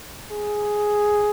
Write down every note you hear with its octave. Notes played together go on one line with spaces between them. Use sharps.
G#4